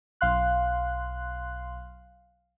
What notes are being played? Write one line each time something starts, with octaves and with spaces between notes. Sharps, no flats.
B1 F5 C6 F#6